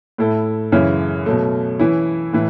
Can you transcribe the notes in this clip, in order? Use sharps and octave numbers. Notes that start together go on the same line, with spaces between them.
A2 A3 E4 A4
F#2 C#3 E3 C#4 E4
B2 F#3 A3
E3 C#4 E4
A2 E3